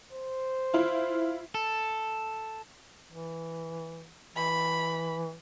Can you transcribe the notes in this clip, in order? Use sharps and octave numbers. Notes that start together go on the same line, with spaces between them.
C5
E4 F4
A4
E3
E3 B5